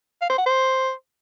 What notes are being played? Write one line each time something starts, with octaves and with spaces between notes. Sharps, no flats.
F5
C5
F#5
C5